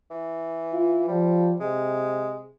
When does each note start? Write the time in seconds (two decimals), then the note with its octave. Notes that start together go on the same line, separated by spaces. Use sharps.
0.11 E3
0.73 F4
1.08 F3 G3
1.60 C3 G#3